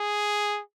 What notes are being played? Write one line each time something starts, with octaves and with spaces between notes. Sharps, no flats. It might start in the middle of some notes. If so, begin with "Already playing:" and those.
Already playing: G#4